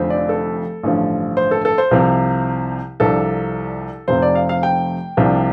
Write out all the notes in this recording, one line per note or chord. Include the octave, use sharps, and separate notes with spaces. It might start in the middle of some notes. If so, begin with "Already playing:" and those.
Already playing: F1 F2 D3 F3 C4
D5
A4
A1 G2 D3 F3
C5
A4
A4
C5
C2 C3 F3
C2 C3 F3 D4 A4
F1 F2 C3 F3 C4 C5
D5
F5
F5
G5
C2 C3 F3 D4